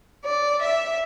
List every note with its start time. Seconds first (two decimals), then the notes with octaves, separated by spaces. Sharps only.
0.25 D5
0.61 E5